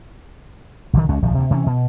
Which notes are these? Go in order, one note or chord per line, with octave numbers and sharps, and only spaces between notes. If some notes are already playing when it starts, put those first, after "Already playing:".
B1 D3 D#3
C#2 G#3 C#4
D1 A#1 F3
D2 C3
C3 E3 G3 C#4
B2